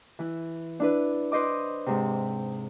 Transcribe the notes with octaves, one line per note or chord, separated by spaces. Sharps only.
E3 E4
D4 E4 B4
B4 C5 D#5 D6
G#2 C3